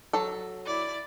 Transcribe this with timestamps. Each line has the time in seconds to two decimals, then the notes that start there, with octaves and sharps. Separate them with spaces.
0.13 F#3 A4
0.66 E4 D5